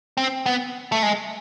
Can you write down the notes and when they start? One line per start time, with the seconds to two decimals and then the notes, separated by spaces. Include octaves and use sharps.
0.17 C4
0.46 B3
0.92 A3
1.03 G#3